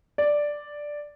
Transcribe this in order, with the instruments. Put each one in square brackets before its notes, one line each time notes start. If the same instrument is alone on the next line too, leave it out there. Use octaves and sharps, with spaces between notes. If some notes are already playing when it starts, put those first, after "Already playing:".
[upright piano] D5